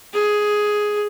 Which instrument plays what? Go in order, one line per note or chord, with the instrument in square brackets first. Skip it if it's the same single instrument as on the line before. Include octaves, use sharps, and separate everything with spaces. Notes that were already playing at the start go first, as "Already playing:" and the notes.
[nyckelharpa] G#4